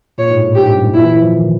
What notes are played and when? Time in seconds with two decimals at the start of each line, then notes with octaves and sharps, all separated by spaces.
0.18 A#2 C#5
0.30 G#2
0.38 A2
0.56 G#2 G4
0.66 G2
0.75 F#2
0.84 G#2
0.93 A#2 E4
1.03 E3
1.13 E3
1.22 F3
1.32 D#3